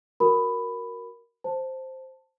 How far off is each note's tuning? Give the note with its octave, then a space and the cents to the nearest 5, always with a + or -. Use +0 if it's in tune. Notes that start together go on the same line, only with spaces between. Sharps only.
F#4 +0 A#4 +0 B5 +10
C5 +0 A5 +10